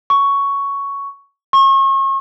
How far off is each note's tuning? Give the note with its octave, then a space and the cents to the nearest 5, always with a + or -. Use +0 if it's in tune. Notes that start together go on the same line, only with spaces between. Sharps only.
C#6 +10
C#6 -35